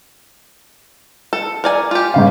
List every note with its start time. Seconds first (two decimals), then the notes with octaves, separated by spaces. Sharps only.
1.33 A4
1.64 A#4 D5 G#5
1.91 F4 G4
2.14 G1 C#3 F5